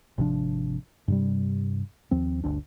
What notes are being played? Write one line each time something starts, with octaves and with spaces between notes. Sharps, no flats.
G#1 C3 F3 D4
G2 C3 G3
D#2 F3 C4
G1 D2 D4